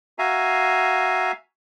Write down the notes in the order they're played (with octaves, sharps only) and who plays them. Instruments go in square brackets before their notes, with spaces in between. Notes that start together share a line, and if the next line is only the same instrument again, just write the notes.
[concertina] F#4 E5 F5 G#5 A#5